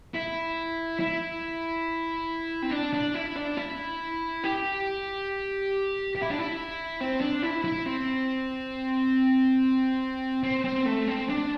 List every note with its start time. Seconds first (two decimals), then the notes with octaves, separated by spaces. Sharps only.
0.14 E4
1.00 E4
2.62 C4
2.71 D4
2.94 D4
3.15 E4
3.37 D4
3.57 E4
4.44 G4
6.15 G4
6.22 E4
6.30 D4
6.39 E4
7.01 C4
7.21 D4
7.43 E4
7.64 E4
7.86 C4
10.44 C4
10.64 C4
10.86 A3
11.08 C4
11.30 D4